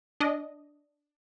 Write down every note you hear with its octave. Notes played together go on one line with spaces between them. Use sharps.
D4 D#5